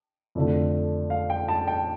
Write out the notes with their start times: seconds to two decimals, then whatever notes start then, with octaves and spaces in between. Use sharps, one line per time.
0.35 F2 D3 A3
1.10 F5
1.30 G5
1.48 A5
1.67 G5